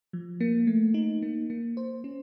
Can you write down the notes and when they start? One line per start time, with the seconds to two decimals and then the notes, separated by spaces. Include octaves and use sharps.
0.13 F3
0.40 A#3
0.67 A3
0.94 D#4
1.22 A#3
1.50 A#3
1.77 C5
2.04 C#4